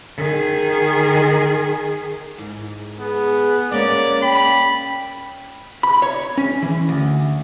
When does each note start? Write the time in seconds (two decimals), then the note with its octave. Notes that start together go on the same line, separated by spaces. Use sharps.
0.17 D#3 G#4
2.38 G#2
2.99 B3 G#4
3.71 G#3 A#3 C#4 C#5 D5
4.22 G5 B5
5.83 B5
6.02 C#5
6.38 C#4
6.62 E3
6.89 D2